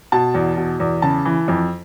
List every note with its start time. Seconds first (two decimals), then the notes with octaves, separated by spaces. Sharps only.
0.12 B2 A5
0.34 E2
0.57 B2
0.80 E2
1.02 C#3 A5
1.25 E3
1.48 F2